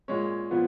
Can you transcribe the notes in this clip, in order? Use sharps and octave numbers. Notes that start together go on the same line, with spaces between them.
A#2 G#3 C#4 C#5
A#2 F3 B3